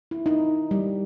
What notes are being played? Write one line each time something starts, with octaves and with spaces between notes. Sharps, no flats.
E4
D#4
G3